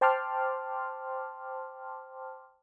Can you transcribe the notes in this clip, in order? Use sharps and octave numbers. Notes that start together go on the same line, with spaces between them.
C5 G5 A5 C6 D6 F6